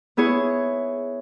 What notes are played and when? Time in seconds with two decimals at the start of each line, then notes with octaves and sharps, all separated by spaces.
0.17 B3 E4 G#4 C#5